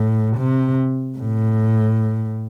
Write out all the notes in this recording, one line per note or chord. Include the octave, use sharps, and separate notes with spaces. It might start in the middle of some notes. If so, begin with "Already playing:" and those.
Already playing: A2
C3
A2